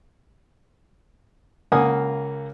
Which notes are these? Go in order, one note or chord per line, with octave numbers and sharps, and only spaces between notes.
C#2 A#3 F#5 G#5 D#6